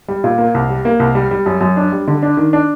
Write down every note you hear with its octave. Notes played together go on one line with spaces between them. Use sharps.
G3
A#2
A#3
C2
G3
A#3
C2
G3
G3
F#2
F#2
D4
G3
D3
D4
D#3
D4